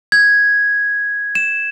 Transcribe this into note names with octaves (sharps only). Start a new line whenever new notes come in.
G#6
E7